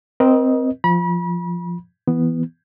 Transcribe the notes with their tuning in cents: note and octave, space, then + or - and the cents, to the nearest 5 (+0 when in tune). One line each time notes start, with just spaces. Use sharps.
C4 -5 A#4 +40 D#5 +0
F3 +0 B5 -35
E3 +0 B3 +0